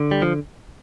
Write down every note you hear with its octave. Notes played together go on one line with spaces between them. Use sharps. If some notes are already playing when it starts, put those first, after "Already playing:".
Already playing: D3
G3
F3